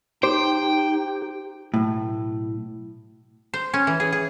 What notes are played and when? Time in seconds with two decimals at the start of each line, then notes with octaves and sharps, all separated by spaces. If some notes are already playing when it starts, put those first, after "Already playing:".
0.23 D#4 G4 C5 G5
1.74 B1 A2
3.54 C5
3.74 C#4
3.87 E3
4.00 G#4
4.12 G#4